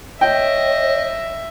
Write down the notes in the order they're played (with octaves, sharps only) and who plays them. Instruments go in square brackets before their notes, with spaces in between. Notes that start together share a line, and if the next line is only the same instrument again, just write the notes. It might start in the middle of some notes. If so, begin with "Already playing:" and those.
[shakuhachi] C#5 [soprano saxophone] D#5 [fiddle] E5 [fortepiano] G5